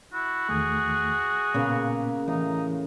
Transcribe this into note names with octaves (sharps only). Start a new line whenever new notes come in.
E4 F#4
E2 D#3 A3 G#4
A#2 C#3 A#3 B3
A2 E3 D#4